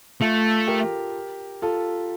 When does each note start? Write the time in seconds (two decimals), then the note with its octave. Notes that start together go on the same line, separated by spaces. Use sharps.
0.21 A3 F4 A4
0.68 G4 A#4
1.62 F4 A4